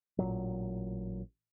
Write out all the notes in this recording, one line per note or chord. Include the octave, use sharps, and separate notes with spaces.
A1 A#2 F#3